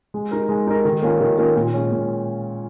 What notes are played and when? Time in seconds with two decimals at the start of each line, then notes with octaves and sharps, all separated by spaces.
0.14 G#3
0.31 D#4 A#4
0.49 G#3
0.67 D#4 A#4
0.85 D#3
1.02 A#3 C#4 F4 A#4
1.21 D#3
1.38 A#3 C#4 F4 A#4
1.56 A#2
1.74 G#3 C#4
1.91 A#2